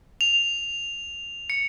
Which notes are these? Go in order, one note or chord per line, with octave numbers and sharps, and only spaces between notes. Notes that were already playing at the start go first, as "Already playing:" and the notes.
F7
C#7